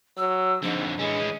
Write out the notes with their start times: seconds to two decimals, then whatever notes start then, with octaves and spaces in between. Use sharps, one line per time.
0.17 F#3 E6
0.62 F2 G#2 D3 D4
0.99 E3 G#3 C#4